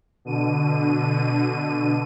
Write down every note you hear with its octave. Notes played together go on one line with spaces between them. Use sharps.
B2 D3 D#7